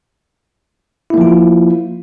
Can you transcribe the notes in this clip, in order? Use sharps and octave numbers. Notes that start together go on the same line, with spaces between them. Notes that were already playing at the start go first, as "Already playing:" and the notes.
F3 A#3 E4 F4